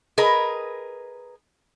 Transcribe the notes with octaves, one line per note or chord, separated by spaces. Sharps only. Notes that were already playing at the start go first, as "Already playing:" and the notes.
G#4 A#4 B4 D#5